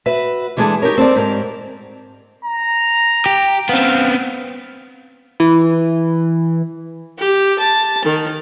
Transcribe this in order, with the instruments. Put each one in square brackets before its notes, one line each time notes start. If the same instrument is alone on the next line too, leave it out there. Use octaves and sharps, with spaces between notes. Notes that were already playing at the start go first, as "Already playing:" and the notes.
[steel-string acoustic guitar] F#4 B4 E5
E3 G3 G#3 D4 G#4 A4
D#4 G4 A4 A#4 C#5
C4 A4 A#4 D5
G#2 G4 A#4
[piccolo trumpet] A#5
[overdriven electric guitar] G4
[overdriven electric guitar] B3 C4 [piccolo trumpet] F5
[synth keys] E3
[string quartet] G4
A5
D#3